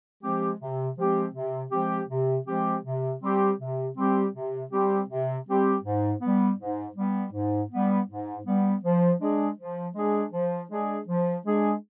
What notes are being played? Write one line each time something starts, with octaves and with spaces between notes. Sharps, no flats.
F3 G#3 C4 G4
C3
F3 G#3 C4 G4
C3
F3 G#3 C4 G4
C3
F3 G#3 C4 G4
C3
G3 C4 G4
C3
G3 C4 G4
C3
G3 C4 G4
C3
G3 C4 G4
G#2
G3 B3
G#2
G3 B3
G#2
G3 B3
G#2
G3 B3
F3
G#3 D4 G#4
F3
G#3 D4 G#4
F3
G#3 D4 G#4
F3
G#3 D4 G#4